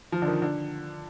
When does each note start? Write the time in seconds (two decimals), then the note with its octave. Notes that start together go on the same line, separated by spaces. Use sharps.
0.12 F3
0.22 D3
0.28 D#3
0.42 D3